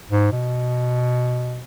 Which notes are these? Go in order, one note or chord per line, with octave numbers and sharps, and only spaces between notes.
G#2
B2